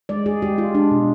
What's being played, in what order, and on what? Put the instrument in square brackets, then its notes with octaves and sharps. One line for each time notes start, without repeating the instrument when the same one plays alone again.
[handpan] G#3 D5
G#3 G#4
G#3 G4
G#3 F4
G#3 D4
B2